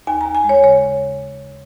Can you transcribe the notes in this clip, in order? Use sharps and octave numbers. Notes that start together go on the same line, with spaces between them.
D#2 G#5
A#5
D#2
G#5
G#3
C#5
C#3 C#5